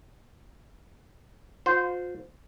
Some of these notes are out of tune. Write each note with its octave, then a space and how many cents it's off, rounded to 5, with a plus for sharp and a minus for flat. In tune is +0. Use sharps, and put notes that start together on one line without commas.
F4 +40 C5 -15